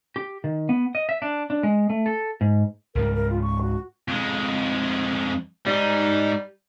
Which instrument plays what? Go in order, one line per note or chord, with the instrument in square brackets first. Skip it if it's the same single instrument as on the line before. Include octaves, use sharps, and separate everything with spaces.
[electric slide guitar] G4
D#3
B3
D#5
E5
D4
D4
G#3
A3
A4
G#2
[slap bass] C#2 G#2 G3 [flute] A#4
[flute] A#4
F4
C#6
F#4
[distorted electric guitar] F2 G#3
[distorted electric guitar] G#2 D#4 [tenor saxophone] G3